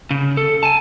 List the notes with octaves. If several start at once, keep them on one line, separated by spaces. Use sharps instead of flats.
C#3
A4
G#5 A5